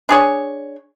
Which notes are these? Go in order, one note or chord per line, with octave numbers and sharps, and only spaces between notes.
D4 G#4 C#5